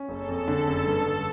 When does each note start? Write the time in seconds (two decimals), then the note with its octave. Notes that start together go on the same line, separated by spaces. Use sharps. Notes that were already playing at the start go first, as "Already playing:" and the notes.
Already playing: C#4
0.09 F#1 A4
0.29 F2
0.48 D3
0.67 F#1
0.87 G2
1.06 D3